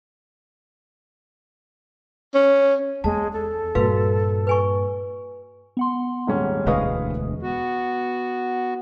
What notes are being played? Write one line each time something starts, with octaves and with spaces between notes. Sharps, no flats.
C#4
E2 G#3 A5
A4
G2 A#2 F#4 B4 F5
B4 G#5 C#6
B3 F#5 C6
D#1 G#2 C#4
E1 D2 G#3 B4 D#5 F5 C#6 D#6
B3 F#4